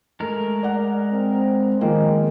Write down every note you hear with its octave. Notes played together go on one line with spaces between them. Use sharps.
G#3 A3 A#4
D5 F#5
C4
D#3 F3 G#3 A#3